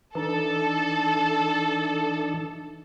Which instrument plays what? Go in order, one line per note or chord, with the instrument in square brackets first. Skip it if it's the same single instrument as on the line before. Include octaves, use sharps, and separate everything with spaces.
[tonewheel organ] E3 D4 D#4 [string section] A4